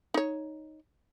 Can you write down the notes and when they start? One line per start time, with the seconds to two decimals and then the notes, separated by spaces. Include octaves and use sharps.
0.14 D#4 C#5